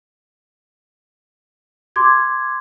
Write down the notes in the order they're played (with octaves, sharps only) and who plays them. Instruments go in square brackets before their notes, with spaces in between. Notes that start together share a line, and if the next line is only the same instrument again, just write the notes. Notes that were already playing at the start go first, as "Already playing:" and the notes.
[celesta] C6 D6 G#6